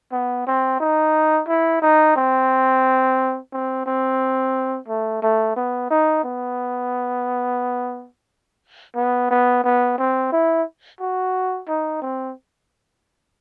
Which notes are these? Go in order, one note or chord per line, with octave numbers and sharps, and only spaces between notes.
B3
C4
D#4
E4
D#4
C4
C4
C4
A3
A3
B3
D#4
B3
B3
B3
B3
C4
E4
F#4
D#4
C4